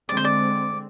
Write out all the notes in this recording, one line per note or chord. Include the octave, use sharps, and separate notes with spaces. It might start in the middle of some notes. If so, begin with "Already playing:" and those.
D3 G#3 C4 D5
C5
D5